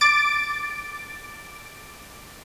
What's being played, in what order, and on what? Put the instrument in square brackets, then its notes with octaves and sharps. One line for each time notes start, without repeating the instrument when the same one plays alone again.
[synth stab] D6 A6 D7